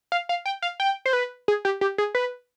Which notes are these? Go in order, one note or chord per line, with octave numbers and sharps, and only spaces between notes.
F5
F5
G5
F5
G5
C5
B4
G#4
G4
G4
G#4
B4